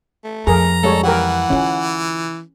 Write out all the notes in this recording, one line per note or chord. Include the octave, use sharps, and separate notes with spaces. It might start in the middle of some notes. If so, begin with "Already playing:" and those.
A3
F2 G#4 A#4 A#5
G3 G#3 A4 C#5
E3 G4 A#4 F#5
D3 C#4 F4